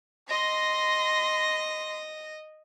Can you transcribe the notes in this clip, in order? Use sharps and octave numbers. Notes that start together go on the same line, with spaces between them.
D#5 C6 A#6